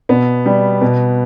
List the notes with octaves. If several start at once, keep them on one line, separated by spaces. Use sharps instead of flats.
B2 B3
G3
B2